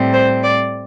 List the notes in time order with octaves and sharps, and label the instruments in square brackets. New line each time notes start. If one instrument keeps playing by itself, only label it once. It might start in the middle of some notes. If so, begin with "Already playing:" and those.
Already playing: [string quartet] A2 G3 C4
C5
D5